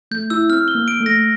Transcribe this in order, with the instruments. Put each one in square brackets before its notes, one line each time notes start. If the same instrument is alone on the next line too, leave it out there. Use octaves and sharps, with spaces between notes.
[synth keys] A3 [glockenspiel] G6
[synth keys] E4 [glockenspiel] E6
[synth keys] C4 [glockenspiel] F6
[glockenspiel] G7
[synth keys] A#3
[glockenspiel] D7
[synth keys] A3
[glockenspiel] A#6